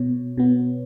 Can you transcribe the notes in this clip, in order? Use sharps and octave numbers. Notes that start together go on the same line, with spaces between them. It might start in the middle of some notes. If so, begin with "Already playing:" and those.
Already playing: B2 B3 C#5
B2 B3